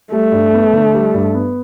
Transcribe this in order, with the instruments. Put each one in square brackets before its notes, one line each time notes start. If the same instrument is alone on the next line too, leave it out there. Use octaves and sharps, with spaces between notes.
[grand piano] G3 [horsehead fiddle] A3
[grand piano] G2
B3
D3
G3
G2
B3